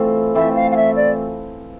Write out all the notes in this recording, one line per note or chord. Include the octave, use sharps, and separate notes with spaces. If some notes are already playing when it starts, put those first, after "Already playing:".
Already playing: E3 A3 C4 F4
E3 A3 C4 F4 E5
F5
F5
E5
D5